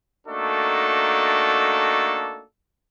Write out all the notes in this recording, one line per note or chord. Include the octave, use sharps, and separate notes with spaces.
A3 A#3 D4 D#4 F#4 A4